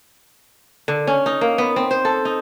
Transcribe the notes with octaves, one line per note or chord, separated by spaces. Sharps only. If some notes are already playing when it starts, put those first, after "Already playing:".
D3
C#4
D#4
A#3
B3
C4
C5
A4
D#4